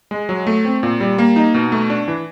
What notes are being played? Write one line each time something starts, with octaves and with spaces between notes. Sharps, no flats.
G#3
F#3
A3
C4
A#2
G3
A#3
D#4
B2
A3
D4
E3